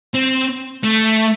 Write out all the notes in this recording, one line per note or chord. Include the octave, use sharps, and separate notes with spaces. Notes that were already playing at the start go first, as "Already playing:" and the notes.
C4
A3